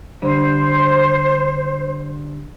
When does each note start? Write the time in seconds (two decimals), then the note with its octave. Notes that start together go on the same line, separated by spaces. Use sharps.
0.22 D3 G3 C5